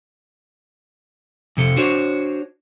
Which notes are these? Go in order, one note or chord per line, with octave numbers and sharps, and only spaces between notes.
F2 C3 A4
D4 F#4 C5 C#5